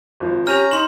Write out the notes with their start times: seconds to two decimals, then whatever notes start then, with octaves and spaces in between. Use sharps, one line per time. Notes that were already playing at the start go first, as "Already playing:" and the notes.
0.20 G#1 F3
0.47 C#4 G4 A#5 F6 G6 D#7 F7
0.71 D#4 C6 E7 F#7